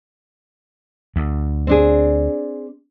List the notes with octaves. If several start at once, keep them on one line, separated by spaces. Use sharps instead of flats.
D2
C4 D4 G#4